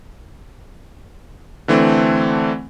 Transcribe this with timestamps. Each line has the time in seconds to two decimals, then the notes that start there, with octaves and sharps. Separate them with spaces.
1.68 D3 E3 A3 C4